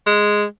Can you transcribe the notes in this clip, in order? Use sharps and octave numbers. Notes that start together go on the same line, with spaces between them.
G#3